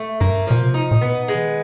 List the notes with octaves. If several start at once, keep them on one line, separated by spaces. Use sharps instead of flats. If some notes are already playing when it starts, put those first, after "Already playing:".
Already playing: A3
G2 A#3
B2 F3
C3
D#4
A#2
B2 B3
G#3
E3
D#3